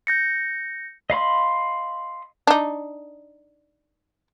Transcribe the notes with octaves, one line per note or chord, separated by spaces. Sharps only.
G6 A#6 C#7
D#5 F5 B5 C6
D4 D#4